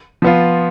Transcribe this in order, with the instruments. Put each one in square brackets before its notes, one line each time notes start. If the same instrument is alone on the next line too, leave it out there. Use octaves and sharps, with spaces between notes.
[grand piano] F3 B3 F4